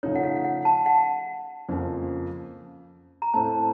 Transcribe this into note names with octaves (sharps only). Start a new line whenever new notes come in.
C#3 F3 A3 D#4 C#5
F#5
F5
F5
F#5
A5
F#5
F2 C#3 F3 A#3 C#4
A#5
A2 A3 C4 A5